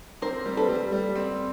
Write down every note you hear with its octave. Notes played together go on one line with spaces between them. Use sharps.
C4 A#4 C5
G3
A4 B4
G3
G3
C4